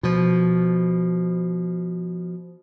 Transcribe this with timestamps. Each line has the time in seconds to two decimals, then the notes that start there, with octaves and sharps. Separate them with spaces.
0.03 B2 F3